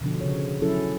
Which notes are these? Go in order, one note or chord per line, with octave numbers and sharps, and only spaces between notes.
B2 D3 F3 D4
C#3 C#5
F#3 C#4 E4 A4